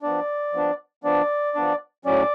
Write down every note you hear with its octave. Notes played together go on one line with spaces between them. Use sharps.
F3 B3 D4 D5
F3 B3 D4
F3 B3 D4 D5
F3 B3 D4
A2 F#3 C#4 D5